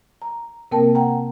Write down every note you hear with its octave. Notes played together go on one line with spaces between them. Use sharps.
A#5
C3 A#3 C4 A#4 G5 A5
F#5 G5 A#5